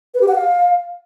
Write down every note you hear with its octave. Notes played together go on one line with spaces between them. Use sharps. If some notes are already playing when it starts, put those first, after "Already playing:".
B4
G4
F#5
F5